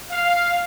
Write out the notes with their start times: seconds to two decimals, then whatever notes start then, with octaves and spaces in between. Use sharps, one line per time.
0.11 F5